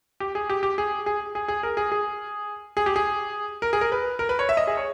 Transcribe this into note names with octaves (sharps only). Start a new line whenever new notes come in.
G4
G#4
G4
G4
G#4
G#4
G#4
G#4
A#4
G#4
G#4
G#4
G4
G#4
A#4
G#4
A#4
B4
A#4
B4
C#5
E5
D#5
G#4
C#5